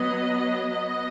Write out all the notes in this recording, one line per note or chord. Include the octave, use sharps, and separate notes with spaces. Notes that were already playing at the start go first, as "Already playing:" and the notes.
Already playing: F#3 B3 D#5
F#3 B3 D#5